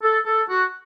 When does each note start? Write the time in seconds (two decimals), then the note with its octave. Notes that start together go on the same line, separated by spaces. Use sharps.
0.03 A4
0.26 A4
0.49 F#4